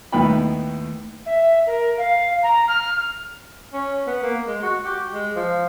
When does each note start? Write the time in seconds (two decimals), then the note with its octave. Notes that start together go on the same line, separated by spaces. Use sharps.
0.12 D#2 A2 B3 D#4 G5 B5
1.25 E5
1.66 A#4
1.98 F5
2.42 A#5
2.67 F6
3.73 C#4
4.07 B3
4.23 A#3
4.47 G#3
4.63 F#4
4.85 G4
5.13 G#3
5.36 F3